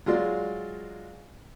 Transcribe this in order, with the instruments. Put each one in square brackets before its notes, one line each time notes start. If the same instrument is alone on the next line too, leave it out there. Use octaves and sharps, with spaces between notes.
[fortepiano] F#3 G#3 F4 D5